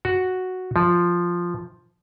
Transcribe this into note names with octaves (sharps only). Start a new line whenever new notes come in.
F#4
F3